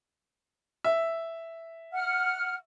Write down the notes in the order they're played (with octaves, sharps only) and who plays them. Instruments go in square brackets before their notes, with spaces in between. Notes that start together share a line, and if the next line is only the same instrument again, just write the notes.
[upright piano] E5
[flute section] F#5 F6